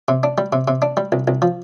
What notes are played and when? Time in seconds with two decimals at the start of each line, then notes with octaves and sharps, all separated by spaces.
0.08 C3
0.23 D4
0.38 G3
0.53 C3
0.68 C3
0.82 D4
0.97 G3
1.12 C2
1.28 C2
1.42 F3